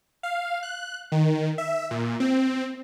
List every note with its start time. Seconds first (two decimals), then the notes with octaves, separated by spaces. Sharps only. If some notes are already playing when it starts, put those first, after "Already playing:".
0.23 F5
0.63 F#6
1.12 D#3
1.58 E5
1.91 A#2
2.20 C4